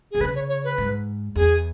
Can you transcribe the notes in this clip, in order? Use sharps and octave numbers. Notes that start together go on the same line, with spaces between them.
B2 G#4
C#3 B4
C#5
C#5
B4
G#2
E2 G#4